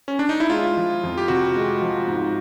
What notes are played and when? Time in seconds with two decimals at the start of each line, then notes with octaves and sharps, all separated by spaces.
0.08 C#4
0.19 D4
0.29 D#4
0.40 E4
0.50 G#3 F4
0.76 F3
1.03 F2
1.18 G4
1.28 C3 F#4
1.56 G#3
1.81 F3
2.08 G#2